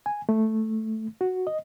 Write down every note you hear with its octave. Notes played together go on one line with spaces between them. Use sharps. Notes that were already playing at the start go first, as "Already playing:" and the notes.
G#5
A3
F#4
D#5